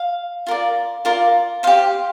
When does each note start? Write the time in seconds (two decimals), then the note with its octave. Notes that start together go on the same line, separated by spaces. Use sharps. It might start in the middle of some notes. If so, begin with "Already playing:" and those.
Already playing: F5
0.47 F4 A#4 D5
1.05 F4 A#4 D5
1.63 G4 C5 F5